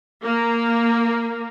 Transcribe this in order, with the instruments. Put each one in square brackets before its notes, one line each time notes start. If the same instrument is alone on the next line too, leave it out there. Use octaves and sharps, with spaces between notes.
[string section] A#3